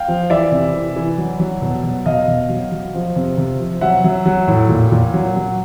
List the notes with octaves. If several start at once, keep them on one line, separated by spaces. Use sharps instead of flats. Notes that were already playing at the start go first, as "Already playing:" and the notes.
Already playing: F5 G5
F3
E3 D5 E5
C3
E3
E3
F#3
F#3
B2
F#3
B2 D#5 F5
B2
F#3
F#3
F3
C3
C3
F3
F#3 E5 F#5
F#3
F#3
A2
A#2
A#2
F#3
F#3